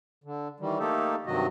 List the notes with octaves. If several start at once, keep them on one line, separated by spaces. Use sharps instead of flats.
D3
D#3 E3 G3
A3 A#3 D#4 G4 A4
G2 C3 D#3 F#3 F#4 D#5